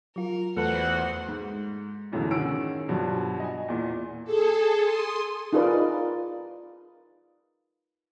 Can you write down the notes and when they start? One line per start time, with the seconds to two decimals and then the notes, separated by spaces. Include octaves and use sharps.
0.16 F#3 F4 A#4
0.57 E2 A3 F#4 A4 B4 C5 F#5
1.28 G#2
2.12 A1 F#2 B2 D3 E3
2.31 D#3 C#4 F#4 G#4 E6 D7
2.89 G2 B2 F3 F#3
3.40 D#5 G#5
3.68 E2 A#2
4.24 G#4 A4
4.80 C6 D#6
5.53 D#4 F4 G#4 A#4 B4 D5